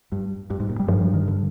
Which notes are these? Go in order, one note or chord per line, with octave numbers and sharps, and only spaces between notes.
G2
G2
G#2
A#2
G3
G2 F3
F3
D#3
D3